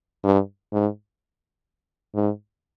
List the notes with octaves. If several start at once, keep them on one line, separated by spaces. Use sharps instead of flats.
G2
G#2
G#2